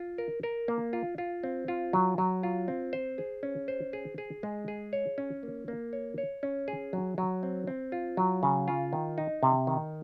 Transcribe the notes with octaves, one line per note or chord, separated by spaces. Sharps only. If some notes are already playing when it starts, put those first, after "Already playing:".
Already playing: F4
A#4
A#4
A#3
F4
F4
C4
F4
F#3
F#3
F4
C4
C5
G#4
C#4
C5
G#4
G#4
G#3
G#4
C#5
C#4
A#3
A#3
C#5
C#5
C#4
G#4
F#3
F#3
C4
C4
F4
F#3
C#3
F4
D#3
D#4
C3
D#3